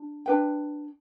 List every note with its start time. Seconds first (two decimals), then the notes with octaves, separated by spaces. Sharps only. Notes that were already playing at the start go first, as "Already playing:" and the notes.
Already playing: D4
0.26 D4 B4 G5